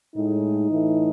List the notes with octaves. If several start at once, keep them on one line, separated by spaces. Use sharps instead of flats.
A2 G#3 D#4
A2 E3 A3